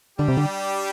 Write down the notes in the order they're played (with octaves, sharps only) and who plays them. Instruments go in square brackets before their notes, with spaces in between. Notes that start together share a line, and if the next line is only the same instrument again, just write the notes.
[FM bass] D3 [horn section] G3 D4 G4
[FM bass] C3
D3